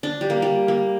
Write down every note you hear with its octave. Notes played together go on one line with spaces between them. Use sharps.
D4
G3
A#3
G3
A#3